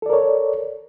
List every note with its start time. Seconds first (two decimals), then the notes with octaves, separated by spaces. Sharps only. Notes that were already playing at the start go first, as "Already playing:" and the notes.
0.02 A4
0.06 D5
0.10 A#4
0.13 C#5